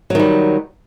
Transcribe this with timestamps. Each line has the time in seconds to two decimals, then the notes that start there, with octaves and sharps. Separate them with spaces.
0.10 F#3
0.15 D#3
0.19 G3